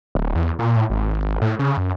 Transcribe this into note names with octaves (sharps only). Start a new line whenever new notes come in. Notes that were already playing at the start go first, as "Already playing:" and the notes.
D1
E2
A#2
A2
G#1
A2
C#3
F#2